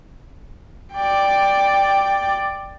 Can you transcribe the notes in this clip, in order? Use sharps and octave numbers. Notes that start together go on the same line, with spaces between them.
D5 G5